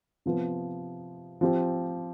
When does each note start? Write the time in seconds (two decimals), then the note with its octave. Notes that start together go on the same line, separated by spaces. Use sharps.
0.26 C3 F3 B3
1.41 F3 C4 G4